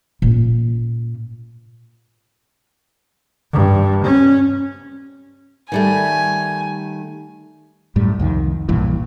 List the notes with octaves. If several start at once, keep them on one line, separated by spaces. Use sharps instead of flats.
A#2 C#4
G2
C#4
D#3 G3 A3 G#5
F#2 A2 G3
C2 F2 D#3
B1 G2 A#2 E3